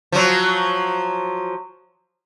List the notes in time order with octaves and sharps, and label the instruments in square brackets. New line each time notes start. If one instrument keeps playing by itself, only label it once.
[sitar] F3 F#3